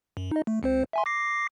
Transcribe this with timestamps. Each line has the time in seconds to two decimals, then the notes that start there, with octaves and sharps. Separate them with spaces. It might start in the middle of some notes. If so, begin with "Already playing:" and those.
0.17 F#2
0.31 D#4 D#5
0.47 A3
0.63 C#2 C4 C5
0.93 E5 G#5 C6
1.06 D6 A#6 C7